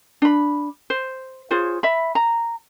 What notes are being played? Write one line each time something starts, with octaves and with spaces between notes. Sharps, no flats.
D4 B5
C5
F4 G#4 C5 C#5
E5 B5
A#5